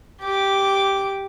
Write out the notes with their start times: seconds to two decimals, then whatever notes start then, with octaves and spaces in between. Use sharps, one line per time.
0.21 G4 D6